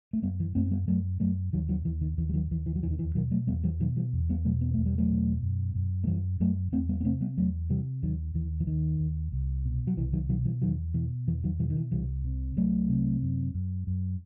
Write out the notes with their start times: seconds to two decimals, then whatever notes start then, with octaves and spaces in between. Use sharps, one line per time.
0.13 A3
0.22 F#2 G3 B3
0.40 E3
0.55 F#2 A3 C4
0.66 C4
0.71 G3 B3
0.88 F#2 F#3 A3
1.20 F#2 F#3 A3
1.53 D#2 D#3 F#3
1.69 D#3 F#3
1.85 D#2 E3
2.01 D#3
2.18 D#2 E3
2.29 G3
2.34 D#3 F#3
2.51 D#2 E3
2.66 E3
2.76 F#3
2.82 E2 E3
2.91 D#3
2.99 E3
3.15 B2 D#3 F#3
3.31 F#3 A3
3.47 E2 G3 B3
3.64 E3 G3
3.80 B2 D#3 F#3
3.97 E3 G3
4.13 E2
4.29 G3 B3
4.45 B2 F#3 A3
4.61 B3
4.74 E2 A3
4.86 G3
4.98 F#3 A3
5.10 B2
5.43 F#2
5.75 F#2
6.04 A3
6.07 F#2 E3 G3
6.40 F#2 F#3 A3
6.72 E2 A3 C4
6.89 G3 B3
7.01 B3
7.05 C3 A3 C4
7.21 G3 B3
7.37 E2 F#3 A3
7.69 C3 E3 G3
8.03 D#2 D#3 F#3
8.34 D#2 E3
8.60 E3
8.67 D#2 D#3
9.00 D#2
9.32 C2
9.65 B2
9.87 F#3
9.97 C2 E3
10.13 D#3 F#3
10.29 B2 D#3 F#3
10.45 E3 G3
10.62 E2 D#3 F#3
10.94 B2 E3
11.27 E2 E3
11.44 D#3 F#3
11.59 B2 E3 G3
11.70 D#3
11.76 E3
11.92 C2 E3 G3
12.24 C3
12.56 C2 F#3 A3
12.89 C3
13.22 F#2
13.54 F#2
13.87 F#2